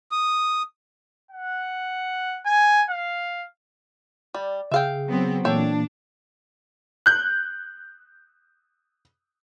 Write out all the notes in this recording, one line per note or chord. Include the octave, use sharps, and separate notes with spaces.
D#6
F#5
G#5
F5
G3 D5
C#3 G#4 E5 F5 G5
F#3 B3 C4
A#2 E3 A#3 D4 A4 C#5 G5
F#6 G6